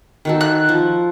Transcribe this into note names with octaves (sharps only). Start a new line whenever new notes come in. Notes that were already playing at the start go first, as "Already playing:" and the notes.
D#3 F#4 A4
F#6
F3